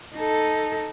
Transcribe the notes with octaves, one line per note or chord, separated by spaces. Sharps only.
D#4 A4